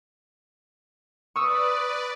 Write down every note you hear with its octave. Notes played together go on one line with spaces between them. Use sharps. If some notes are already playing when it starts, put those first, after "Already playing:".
B4 D5 C#6 D#6 E6